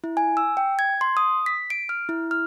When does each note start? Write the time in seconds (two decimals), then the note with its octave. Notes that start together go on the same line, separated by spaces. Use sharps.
0.04 E4
0.17 G#5
0.37 E6
0.57 G5
0.79 G#6
1.01 C6
1.17 D#6
1.46 B6
1.70 D7
1.89 F6
2.09 E4
2.31 F6